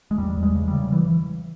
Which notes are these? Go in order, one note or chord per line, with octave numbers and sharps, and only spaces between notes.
G#3
E2 G3
E2
G#3
C#3
G3
C#3
E3